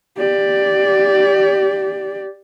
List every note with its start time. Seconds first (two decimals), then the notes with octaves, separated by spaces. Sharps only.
0.17 G4 D5